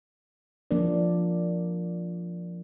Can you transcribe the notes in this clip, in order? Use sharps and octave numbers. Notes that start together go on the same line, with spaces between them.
F3 A#3 D4 A#4 D5